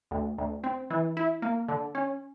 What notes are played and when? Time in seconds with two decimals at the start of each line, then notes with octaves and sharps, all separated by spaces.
0.11 D2
0.38 D2
0.64 C4
0.90 E3
1.17 E4
1.42 A#3
1.68 D3
1.95 C#4